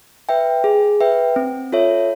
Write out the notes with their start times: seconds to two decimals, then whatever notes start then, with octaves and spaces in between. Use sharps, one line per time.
0.29 B4 E5 G5
0.64 G#4
1.01 B4 E5 G5
1.36 C4
1.72 F4 A4 C#5 E5